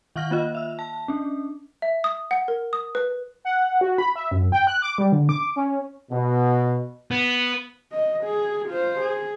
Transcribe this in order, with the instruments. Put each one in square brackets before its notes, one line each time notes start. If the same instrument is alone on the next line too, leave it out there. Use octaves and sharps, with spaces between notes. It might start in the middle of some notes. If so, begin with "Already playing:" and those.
[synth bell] D#3 F5 F#5 C#6 F6 A#6
A#3 F4 D#5
E5 E6
A5
C#4 D4
[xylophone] E5
D#6
F#5
A#4
D#6
B4
[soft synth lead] F#5
F#4
B5
E5
F#2
G5
F#6
D6
G3
D3
D6
C#4
[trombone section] B2
[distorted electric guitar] B3
[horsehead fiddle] D#5
G#4
F4 C5
G#4